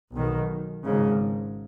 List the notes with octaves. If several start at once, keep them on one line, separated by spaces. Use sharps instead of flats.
B1 B2 D#3
G#1 G#2 C#3